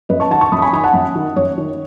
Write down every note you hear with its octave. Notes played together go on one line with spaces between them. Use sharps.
F#2 B4 D#5
A5 C#6
D#3 F#5 A5
A5 C#6
F#2 B5 D#6
C#6
G#5 B5
D#3 G#5 B5
F#5 A5
F#2
D#3
F#2 C#5
D#3